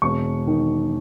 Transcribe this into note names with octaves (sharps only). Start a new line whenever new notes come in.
E1 C#6
D#3